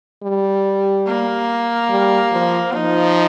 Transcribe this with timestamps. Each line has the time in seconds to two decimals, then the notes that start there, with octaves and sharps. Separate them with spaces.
0.23 G3
1.06 A#3
1.90 G3
2.32 F3
2.73 F3 D#4